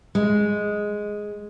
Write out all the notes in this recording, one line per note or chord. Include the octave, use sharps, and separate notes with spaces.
G#3